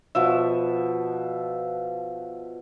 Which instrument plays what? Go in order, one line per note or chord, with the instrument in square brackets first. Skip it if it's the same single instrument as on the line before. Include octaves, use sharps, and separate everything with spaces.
[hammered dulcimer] B2 F3 E5